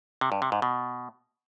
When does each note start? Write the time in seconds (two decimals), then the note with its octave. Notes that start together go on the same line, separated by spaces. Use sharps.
0.21 C3
0.32 G2
0.42 C3
0.52 G#2
0.62 B2